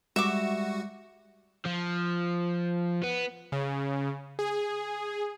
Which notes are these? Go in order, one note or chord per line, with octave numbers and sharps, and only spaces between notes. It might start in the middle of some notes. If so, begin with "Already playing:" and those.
G3 G#3 F#4 E5 D6
F3
B3
C#3
G#4